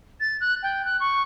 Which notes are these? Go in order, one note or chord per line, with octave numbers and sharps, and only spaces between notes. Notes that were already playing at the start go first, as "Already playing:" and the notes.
A6
F#6
G5
F#6
C#6